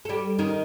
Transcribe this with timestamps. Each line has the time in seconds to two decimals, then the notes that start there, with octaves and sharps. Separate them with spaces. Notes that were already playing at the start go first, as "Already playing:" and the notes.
0.05 A4
0.09 G3 G4
0.39 D#3 D#4